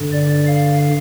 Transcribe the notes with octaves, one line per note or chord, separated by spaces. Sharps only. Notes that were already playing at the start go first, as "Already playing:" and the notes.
Already playing: G2 D3
D5
F5